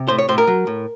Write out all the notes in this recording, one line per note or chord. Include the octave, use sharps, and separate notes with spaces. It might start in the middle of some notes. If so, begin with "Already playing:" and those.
Already playing: C3
A2 C5
C#5
A2 C5
A#4
F#3
A2